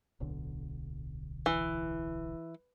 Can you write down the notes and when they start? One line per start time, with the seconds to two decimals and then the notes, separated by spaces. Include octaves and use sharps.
0.20 D1 B1 D3
1.46 E3